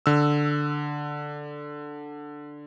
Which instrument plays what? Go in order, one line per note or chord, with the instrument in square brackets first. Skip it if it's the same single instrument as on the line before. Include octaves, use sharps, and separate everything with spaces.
[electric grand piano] D3 E6